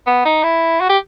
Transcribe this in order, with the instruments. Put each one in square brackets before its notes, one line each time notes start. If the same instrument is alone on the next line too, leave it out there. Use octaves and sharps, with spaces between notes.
[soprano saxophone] B3
D#4
E4
F#4
G4